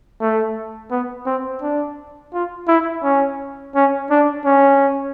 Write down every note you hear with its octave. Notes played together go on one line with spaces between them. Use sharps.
A3
B3
C4
D4
F4
E4
C#4
C#4
D4
C#4